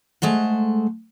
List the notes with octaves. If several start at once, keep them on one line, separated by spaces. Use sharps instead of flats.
G#3 A3 C5 F#5